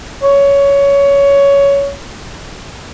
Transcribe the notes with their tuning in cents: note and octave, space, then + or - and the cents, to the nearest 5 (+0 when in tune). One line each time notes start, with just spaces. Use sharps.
C#5 +15